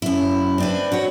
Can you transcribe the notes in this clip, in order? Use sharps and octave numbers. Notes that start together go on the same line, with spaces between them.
F#2 E4
C4 D4 B4
F#4 C#5